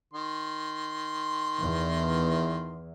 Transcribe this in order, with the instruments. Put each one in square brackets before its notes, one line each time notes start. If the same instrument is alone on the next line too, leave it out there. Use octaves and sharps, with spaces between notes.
[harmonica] D#3 C6
[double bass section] E2